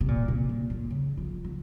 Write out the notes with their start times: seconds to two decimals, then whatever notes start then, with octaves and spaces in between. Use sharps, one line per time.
0.01 C3
0.08 A#2
0.28 C3
0.49 A#2
0.70 F#2
0.90 C#3
1.17 F3
1.45 F#3